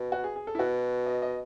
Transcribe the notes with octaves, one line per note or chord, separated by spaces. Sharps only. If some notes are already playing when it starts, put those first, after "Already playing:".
Already playing: B2
F#4
G#4
G#4
A4
E4
B2 F#4
D#5
D#5